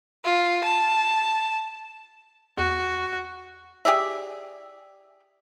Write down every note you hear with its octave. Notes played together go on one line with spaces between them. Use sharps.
F4
A5
E2 F#4
G4 G#4 D5 E5